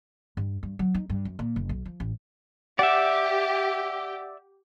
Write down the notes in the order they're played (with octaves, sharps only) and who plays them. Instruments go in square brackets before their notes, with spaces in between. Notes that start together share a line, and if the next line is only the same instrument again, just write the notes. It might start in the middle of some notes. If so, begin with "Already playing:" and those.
[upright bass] G2
G2
F#3
D#4
G2
F#2
A#2
F#1
B1
F3
A1
[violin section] G4 [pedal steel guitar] D5 E5 [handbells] F#5